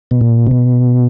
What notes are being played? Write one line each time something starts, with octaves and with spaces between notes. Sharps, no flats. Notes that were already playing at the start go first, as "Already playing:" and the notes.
B2
A#2
C3
B2